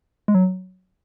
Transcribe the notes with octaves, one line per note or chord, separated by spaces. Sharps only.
G#3
F#3